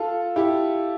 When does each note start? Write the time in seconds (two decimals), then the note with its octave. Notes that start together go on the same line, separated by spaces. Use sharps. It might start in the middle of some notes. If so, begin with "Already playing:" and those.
Already playing: F4 A4
0.36 E4 G4